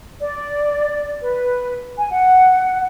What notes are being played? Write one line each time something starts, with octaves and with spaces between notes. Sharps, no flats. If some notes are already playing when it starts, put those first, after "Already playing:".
D5
B4
G#5
F#5